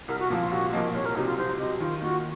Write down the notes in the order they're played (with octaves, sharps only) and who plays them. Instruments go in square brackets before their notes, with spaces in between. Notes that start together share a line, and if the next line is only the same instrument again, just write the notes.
[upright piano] C2 [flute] A#4
[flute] F#4
[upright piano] A#2 F3 A#3
[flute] F4
[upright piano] C2 [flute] F#4
[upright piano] A#2 F3 A#3 [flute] D#5
[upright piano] C2 [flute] C#5
[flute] A#4
[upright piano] C3 F#3 [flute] D#4
[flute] F4
[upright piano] C2 [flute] C5
[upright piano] C3 F#3 [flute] D#5
[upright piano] D#3 [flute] F4
[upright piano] A#3 F4 [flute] F#4